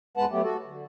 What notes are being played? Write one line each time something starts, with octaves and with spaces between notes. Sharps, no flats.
E2 G#2 G#3 B4 F#5 A5
F#3 A3 B3 G4
F#4 A4
D3